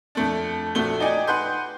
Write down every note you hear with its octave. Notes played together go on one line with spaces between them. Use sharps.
F2 A3 D4
A#1 A3 F#4 G7
D#4 D5 G5 G#5
B4 F#5 C6 G6